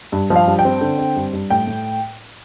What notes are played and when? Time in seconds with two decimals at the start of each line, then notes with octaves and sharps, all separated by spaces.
0.12 G2
0.30 F3
0.36 F5
0.47 G2
0.59 G5
0.65 C4
0.81 D3
0.99 C4
1.16 G2
1.33 G2
1.50 A2 G5
1.67 A2